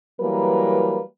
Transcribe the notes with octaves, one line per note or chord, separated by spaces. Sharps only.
E3 F#3 G3 A#3 A#4 B4